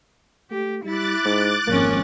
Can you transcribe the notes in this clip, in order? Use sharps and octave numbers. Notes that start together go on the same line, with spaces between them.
A3 G4
G3 E4 D6 F#6 A6
G#2
G#1 F2 A#3 C#4